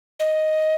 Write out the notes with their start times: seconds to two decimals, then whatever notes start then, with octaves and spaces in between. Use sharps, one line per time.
0.20 D#5